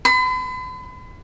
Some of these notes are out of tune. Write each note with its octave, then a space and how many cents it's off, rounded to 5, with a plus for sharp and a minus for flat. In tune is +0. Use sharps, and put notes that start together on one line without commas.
B5 +45